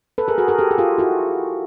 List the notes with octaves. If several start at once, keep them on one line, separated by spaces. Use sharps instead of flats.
A4 B4
G#4 A#4
F#4 G#4
G#4 A#4
G4 A4
G#4
F4 G4
E4 F#4